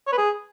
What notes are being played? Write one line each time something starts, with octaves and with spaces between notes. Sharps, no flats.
C#5
B4
G#4